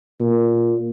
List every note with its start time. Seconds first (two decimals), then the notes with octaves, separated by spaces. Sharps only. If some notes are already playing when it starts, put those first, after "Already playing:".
0.20 A#2